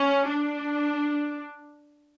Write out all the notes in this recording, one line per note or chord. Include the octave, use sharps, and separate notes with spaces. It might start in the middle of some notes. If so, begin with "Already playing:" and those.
Already playing: C#4
D4